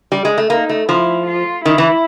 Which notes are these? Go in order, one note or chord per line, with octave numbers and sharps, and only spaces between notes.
G3
G#3
A3
A#3 D#4
A3
F3 E4
F4
D#3 E4
E3